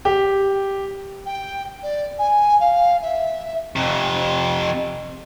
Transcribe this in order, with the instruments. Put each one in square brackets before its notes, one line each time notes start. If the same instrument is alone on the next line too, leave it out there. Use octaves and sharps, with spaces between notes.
[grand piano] G4
[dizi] G5
D5
G#5
F5
E5
[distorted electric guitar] F2 C3